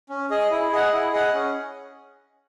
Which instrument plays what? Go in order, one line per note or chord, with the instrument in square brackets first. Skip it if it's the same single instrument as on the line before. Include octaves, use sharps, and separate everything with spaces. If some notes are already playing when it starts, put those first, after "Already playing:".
[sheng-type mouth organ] C#4
G#4 D#5
E4
G#4 D#5 F#5
E4
G#4 D#5 F#5
C#4